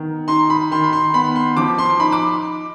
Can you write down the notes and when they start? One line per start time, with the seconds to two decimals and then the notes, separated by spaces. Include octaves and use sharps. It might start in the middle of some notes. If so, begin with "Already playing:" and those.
Already playing: D#3 B3
0.28 D#4 C6
0.50 B5
0.71 D#3 C6
0.84 B5
0.93 C6
1.14 B3 B5
1.36 C6
1.57 F3 D6
1.78 C6
2.00 D#4 B5
2.12 D6